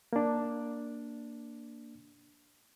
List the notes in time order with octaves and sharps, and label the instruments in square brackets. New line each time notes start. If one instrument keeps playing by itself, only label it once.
[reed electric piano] A#3 D4